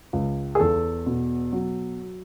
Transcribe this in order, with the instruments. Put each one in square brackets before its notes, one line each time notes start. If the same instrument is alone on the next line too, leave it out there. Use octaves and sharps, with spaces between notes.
[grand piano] C#2
G#4
E2 A4
B2
F#3